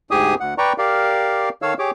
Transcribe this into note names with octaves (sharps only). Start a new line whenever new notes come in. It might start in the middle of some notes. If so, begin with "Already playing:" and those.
D2 G#2 G4 G#4 G#5 D#6
D2 F#5
B4 D5 G5 A#5 C#6
G4 A#4 D5 F5
D#3 A4 C#5 F5 E6
G4 G#4 C#5 D6